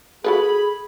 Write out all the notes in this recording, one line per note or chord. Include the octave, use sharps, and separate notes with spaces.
F#4 G#4 A4 B4 B5